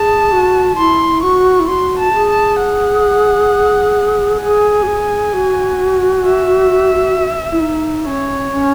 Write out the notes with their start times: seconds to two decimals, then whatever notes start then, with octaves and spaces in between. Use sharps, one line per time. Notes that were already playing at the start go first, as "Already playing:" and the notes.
Already playing: G#4 A5
0.32 F#4
0.77 E4 C6
1.23 F#4 C#6
1.60 E4
1.68 F#4 C6
1.99 A5
2.14 G#4
2.30 A5
2.59 F#5
4.42 G#4 G#5
4.83 F#4
4.87 G#4
5.33 F#4
6.24 E5
7.52 E4
7.61 D#4
8.06 C#4 C#5
8.52 C#4